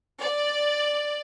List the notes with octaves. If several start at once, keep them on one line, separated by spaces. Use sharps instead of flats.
D5